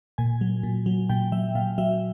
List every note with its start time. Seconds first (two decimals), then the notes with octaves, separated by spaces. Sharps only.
0.18 A#2 G#5
0.41 F#3
0.63 A#2
0.86 F#3
1.09 A#2 G5
1.32 F#3 E5
1.55 A#2 F5
1.78 F#3 E5